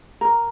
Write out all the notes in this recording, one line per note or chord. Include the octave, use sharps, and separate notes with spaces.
A#4